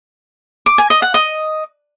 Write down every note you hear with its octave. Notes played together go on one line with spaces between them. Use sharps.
D6
G#5
D#5
F#5
D#5